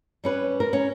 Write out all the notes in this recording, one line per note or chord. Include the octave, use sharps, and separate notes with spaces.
G3 C#4 B4
A#4
C#4